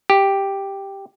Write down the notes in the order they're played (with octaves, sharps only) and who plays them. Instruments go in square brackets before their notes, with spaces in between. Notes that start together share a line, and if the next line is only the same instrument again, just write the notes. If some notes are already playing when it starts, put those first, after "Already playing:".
[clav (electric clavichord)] G4